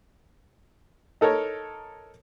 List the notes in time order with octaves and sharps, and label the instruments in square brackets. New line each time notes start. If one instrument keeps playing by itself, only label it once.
[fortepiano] D#4 A4 A#4 C#5